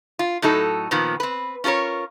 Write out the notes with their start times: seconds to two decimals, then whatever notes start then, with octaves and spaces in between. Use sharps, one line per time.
0.19 F4
0.42 A2 F#3 D#4 A4
0.91 A#2 D#3 F3 B3
1.20 C4 B4
1.64 C#4 F4 A4 A#4 C#5